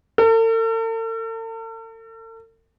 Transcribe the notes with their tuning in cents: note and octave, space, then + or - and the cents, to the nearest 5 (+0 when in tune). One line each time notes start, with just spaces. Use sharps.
A4 +45